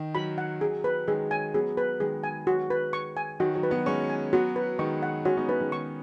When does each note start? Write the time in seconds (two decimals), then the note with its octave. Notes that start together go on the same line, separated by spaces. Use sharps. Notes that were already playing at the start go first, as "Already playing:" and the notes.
Already playing: D#3
0.15 F#3 B5
0.38 F#5
0.61 G#4
0.84 B4
1.07 D#3 G#3 G#4
1.31 G#5
1.54 F#3 B3 G#4
1.77 B4
2.00 D#3 G#3 G#4
2.24 G#5
2.47 F#4
2.70 B4
2.93 C#6
3.17 G#5
3.40 D#3 F#4
3.55 F#3
3.63 B4
3.71 F#3 B3
3.86 G#3 C#4 C#6
4.10 G#5
4.33 F#3 B3 F#4
4.56 B4
4.79 D#3 G#3 C#6
5.03 F#5
5.25 G#3 C#4 F#4
5.37 B3 D#4
5.49 G#3 C#4 B4
5.60 D#3 G#3
5.72 D#3 G#3 C#6